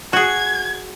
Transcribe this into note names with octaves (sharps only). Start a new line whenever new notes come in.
F#4 G#4 G#6